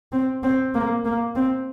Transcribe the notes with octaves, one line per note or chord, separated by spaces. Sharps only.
C4
C4
A#3
A#3
C4